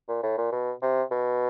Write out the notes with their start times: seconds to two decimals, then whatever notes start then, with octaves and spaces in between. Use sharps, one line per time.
0.09 A#2
0.23 A2
0.38 A#2
0.52 B2
0.82 C3
1.11 B2